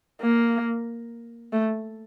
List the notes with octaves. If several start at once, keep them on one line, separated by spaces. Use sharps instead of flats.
A#3
A3